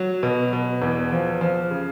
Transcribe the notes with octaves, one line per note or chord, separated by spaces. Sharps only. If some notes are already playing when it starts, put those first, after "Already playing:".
Already playing: F#3
B2
B2
E2
F3
F3
C#3